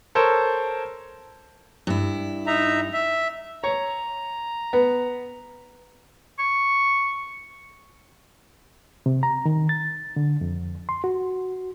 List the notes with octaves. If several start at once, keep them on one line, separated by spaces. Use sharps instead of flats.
A4 A#4 C5 C#5
G2 E4
D#4 E5 A#5
E5
C#5 A#5
B3
C#6
C3
A#5
D#3
A6
D3
F2
C6
F#4